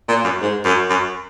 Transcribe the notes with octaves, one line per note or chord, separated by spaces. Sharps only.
A#2
F#2
G#2
F#2
F#2